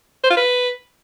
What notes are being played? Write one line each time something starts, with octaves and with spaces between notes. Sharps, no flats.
C5
F4
B4